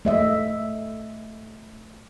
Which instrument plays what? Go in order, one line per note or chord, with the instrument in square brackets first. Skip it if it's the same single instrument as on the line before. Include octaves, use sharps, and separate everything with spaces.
[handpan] A3 D#5 E5